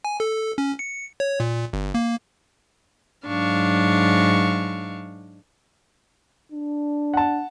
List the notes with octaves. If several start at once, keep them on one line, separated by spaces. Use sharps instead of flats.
G#5
A4
C#4
C#7
C#5
A#2
G1
A#3
G#2 F#3 D4 F5 C#6
D4
F#5 A5